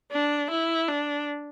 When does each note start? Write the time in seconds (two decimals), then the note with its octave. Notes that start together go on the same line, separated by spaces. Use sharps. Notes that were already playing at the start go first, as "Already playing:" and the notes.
0.12 D4
0.51 E4
0.88 D4